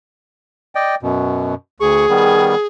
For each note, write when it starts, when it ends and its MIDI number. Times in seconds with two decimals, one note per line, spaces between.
0.75 0.95 74
0.75 0.95 75
0.75 0.95 79
1.03 1.54 42
1.03 1.54 47
1.80 2.06 38
1.80 2.67 68
1.80 2.06 85
2.09 2.55 51
2.09 2.55 55
2.09 2.55 59